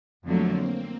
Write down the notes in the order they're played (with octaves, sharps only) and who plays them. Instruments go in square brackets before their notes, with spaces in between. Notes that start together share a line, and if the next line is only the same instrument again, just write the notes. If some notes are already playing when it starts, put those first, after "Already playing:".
[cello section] F2 D3 F#3 A3 [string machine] A#3 C4